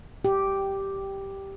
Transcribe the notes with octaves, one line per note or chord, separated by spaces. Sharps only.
G4